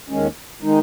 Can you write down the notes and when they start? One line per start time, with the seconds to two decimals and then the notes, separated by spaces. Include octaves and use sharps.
0.10 D#2 D#3 G#3 C#4
0.62 D#3 G#3 D#4